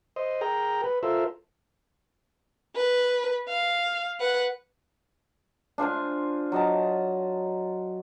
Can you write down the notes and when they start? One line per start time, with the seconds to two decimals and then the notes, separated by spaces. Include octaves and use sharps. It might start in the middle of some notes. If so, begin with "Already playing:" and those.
0.16 C5 D#5
0.41 G#4 A#4 G5 A#5
0.84 B4
1.03 F4 A4 A#4 C5 E5
2.76 B4
3.49 F5
4.20 B4 F#5
5.78 D4 F4 C5 G#5
6.52 F#3 D#5 A5